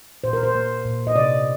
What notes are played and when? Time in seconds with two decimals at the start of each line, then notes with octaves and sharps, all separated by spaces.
0.24 A#2 C5
0.33 A#4
0.43 C5
0.55 A#3
0.85 A#2
1.07 D#5
1.16 C3 D5